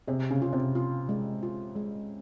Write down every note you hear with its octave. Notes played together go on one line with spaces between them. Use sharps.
C3 G#4
C#3
F4
C3
F4
G#3
F4
G#3